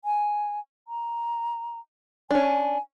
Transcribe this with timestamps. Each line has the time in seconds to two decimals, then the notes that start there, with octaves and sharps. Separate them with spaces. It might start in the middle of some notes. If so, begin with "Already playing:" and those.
0.05 G#5
0.88 A#5
2.31 C#4 D4 G#5